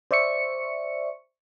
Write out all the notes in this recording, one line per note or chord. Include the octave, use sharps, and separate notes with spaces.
C5 D5 E5 C#6 C#7